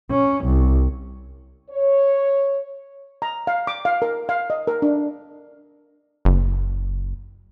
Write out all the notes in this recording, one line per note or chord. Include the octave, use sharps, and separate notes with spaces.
C#4
C2
C#5
A#5
F5
D6
F5
A#4
F5
D#5
A#4
D4
F#1